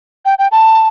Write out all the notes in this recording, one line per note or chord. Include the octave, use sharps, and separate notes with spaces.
G5
G5
A5